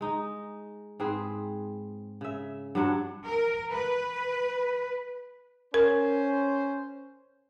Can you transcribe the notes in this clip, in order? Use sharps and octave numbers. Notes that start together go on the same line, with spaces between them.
G#3 D#4 D#5
G#2 C4 G#4 B4
C#3 E5
G2 F#3 D4 F#5
A#4
B4
C#4 A#4 C5